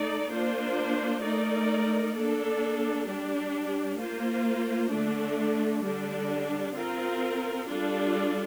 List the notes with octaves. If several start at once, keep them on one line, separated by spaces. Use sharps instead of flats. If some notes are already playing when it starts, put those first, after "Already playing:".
Already playing: A3 D#4 A4 D5
A#3 D4 F4 C5
A3 D#4 A#4 D5
A#3 D4 A4
G3 D4 G4
A#3 F4 C5
D3 A3 D4
D3 G3 D4
C4 F4 A#4
G3 D4 F4 A4